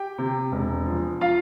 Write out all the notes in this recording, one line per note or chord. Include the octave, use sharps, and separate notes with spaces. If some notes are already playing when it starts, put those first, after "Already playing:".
Already playing: G4 G5
C3
E1
F3
F4 F5